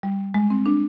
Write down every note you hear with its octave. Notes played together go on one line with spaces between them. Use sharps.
G3
G#3
C4
D4